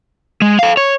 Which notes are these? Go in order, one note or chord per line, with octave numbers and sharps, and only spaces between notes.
G#3
A4 F5
C#5